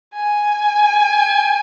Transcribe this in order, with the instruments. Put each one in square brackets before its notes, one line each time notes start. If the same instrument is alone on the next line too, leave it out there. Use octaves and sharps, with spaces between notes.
[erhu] G#5